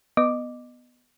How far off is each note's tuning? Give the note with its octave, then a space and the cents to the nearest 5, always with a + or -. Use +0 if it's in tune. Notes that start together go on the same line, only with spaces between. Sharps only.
B3 +0 D#5 -20 D6 +0